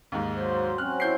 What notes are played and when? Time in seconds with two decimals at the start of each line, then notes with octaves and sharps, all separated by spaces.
0.12 D#2 G#2
0.36 F#3 C5
0.78 F#3 C4 C#4 F6 F#6
1.00 E4 G6 C7